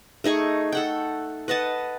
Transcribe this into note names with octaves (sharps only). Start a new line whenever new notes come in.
A3 D#4 G#4 C#6
A4 F#5 G5
B4 D#5 F#5 A5